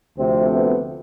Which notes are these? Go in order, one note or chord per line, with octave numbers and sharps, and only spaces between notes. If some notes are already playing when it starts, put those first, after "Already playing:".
D2 C3 F3 A3 C4
B3